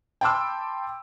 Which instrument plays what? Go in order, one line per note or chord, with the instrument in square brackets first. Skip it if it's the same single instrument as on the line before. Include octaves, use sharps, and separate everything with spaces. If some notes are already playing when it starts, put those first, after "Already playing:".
[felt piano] G5 A5 B5 C6 D6 E6